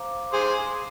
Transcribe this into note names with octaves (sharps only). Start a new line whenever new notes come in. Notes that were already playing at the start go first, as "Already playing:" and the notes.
Already playing: C5 F5 A#5 D6
G#4 C5